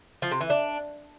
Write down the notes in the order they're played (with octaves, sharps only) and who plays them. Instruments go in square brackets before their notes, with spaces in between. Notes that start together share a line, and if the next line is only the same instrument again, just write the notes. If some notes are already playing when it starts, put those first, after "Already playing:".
[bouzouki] F3
C3
E3
D4